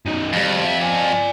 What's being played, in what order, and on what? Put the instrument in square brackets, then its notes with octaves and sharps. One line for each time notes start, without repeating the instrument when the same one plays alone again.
[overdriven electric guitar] F#2 D#3
[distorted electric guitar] F2 [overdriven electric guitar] F3 G3
[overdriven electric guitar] E5
D5 G#5